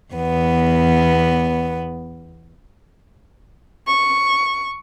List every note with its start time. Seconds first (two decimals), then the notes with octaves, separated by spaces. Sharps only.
0.14 E2 B3
3.87 C#6